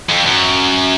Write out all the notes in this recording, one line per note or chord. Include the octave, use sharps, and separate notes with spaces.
F2
F#2